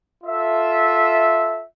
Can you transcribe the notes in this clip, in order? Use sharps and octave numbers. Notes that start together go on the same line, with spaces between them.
F4 A4 E5